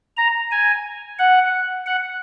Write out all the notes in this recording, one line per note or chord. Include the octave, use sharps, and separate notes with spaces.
A#5
G#5
F#5
F#5